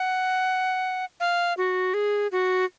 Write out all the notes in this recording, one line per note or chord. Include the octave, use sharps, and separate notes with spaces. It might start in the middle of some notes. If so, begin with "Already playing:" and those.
Already playing: F#5
F5
F#4
G#4
F#4